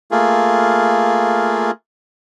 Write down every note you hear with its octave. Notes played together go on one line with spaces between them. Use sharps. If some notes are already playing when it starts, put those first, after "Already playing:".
A3 A#3 F4 G#4